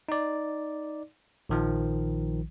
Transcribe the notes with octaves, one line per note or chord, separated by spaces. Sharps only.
D#4 D5
A#1 D#3 F3